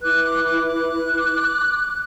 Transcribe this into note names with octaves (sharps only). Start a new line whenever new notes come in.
E4 B4 D6 F#6
D6 F#6
D6 F#6
D6 F#6